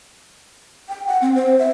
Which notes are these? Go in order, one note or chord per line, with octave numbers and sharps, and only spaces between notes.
G5
F#5
C4
C5
E5